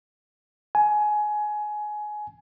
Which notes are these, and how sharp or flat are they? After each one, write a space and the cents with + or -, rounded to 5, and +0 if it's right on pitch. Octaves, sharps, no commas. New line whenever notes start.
G#5 +20